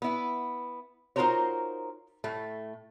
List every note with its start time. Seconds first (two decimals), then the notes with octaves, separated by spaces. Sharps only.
0.02 B3 E4
1.16 D#4 F4 F#4 A#4 C5 C#5
2.24 A2 A3